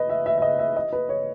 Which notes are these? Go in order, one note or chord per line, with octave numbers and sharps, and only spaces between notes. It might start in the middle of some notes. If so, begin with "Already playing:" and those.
Already playing: B4 D#5
E5
E5
E5
D#5
E5
D#5
B4
C#5